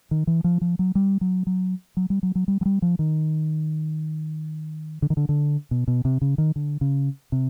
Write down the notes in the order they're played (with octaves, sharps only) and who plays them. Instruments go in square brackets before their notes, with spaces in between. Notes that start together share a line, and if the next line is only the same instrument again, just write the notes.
[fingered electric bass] D#3
E3
F3
F3
F#3
G3
F#3
F#3
F#3
G3
F#3
F#3
G3
F#3
G3
F3
D#3
D3
D#3
D3
D3
B2
B2
C3
C#3
D#3
D3
C#3
C3